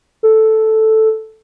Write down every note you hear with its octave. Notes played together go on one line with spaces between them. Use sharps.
A4